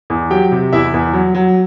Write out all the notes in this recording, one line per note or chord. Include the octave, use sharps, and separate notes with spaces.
E2
F#3 G4 G5
C3
E2 E4 E5
E2
F#3
F#3